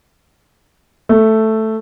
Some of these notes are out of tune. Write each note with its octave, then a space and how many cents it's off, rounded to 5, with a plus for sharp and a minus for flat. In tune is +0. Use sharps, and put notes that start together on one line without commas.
A3 +0